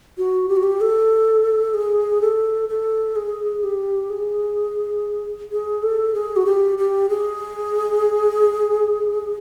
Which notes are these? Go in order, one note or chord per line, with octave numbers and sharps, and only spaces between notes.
F#4
G4
F#4
G4
A4
G#4
A4
A4
G#4
G4
G#4
G#4
A4
G#4
F#4
G4
G4
G#4